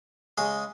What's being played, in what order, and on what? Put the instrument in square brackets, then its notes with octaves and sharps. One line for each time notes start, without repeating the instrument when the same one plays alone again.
[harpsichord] C#3 G#3 D#5